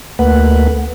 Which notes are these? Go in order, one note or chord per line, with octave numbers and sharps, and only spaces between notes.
D2 A3 A#3 B4 F#5